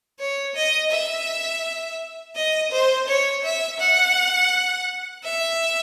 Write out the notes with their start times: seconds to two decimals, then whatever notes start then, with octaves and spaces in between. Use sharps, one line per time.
0.20 C#5
0.55 D#5
0.91 E5
2.36 D#5
2.72 C5
3.08 C#5
3.44 E5
3.80 F#5
5.24 E5